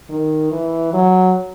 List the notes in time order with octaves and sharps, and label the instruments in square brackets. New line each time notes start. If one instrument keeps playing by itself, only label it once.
[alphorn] D#3
E3
F#3